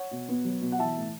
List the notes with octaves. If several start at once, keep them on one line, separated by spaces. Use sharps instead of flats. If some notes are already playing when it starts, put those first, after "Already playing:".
Already playing: C#5 F#5
B2
B3
F#3
B2
F#5
E3 E5 A5
A2